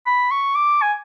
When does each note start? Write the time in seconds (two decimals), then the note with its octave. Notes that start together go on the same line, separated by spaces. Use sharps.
0.06 B5
0.31 C#6
0.55 D6
0.82 G#5